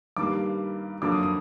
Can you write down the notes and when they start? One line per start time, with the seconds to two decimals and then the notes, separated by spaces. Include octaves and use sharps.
0.17 G2 D#3 G3 A#3 D6
1.02 F2 D3 F#3 A#3 D6
1.12 D#6
1.23 D#6